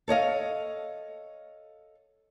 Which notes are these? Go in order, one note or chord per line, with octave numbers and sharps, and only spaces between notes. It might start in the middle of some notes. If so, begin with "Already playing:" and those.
A4 C#5 D#5 F5